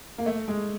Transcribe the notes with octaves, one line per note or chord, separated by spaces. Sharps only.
A#3
A3
G#3